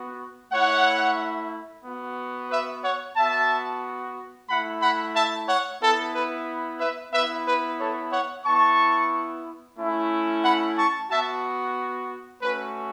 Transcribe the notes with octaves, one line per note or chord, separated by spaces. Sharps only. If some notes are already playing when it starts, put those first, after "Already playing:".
Already playing: B3 F#4
A3 E4 C#5 F#5
B3 F#4
B4 E5
C#5 F#5
B3 F#4 E5 A5
A3 E4 F#5 B5
F#5 B5
E5 A5
C#5 F#5
B3 E4 A4
B4
B4 E5
B3 E4 B4 E5
B4
A4 C#5
C#5 F#5
B3 E4 A5 C#6
A3 C#4 E4
F#5 B5
A5 C#6
B3 F#4 E5 A5
A3 C#4 F#4 B4